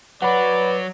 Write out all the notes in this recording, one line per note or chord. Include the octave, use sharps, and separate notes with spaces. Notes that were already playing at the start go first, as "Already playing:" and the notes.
F#3 F#4 B4 D5 F#5 B5